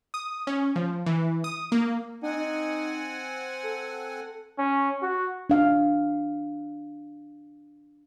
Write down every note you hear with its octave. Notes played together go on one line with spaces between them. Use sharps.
D#6
C#4
F3
E3
D#6
A#3
C4 D#4 F#5 G#5
A4
C#4
F#4
D4 F5